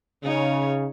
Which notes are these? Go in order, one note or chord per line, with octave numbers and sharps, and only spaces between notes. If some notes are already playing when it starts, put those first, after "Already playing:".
C#3 D#4 C#5